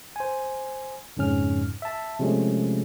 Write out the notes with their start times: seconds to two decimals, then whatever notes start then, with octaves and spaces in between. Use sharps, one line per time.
0.16 C5 G#5
1.17 F2 G#2 C#3 C#4 F6
1.82 E5 A5
2.19 C3 F3 G#3 A3 C#4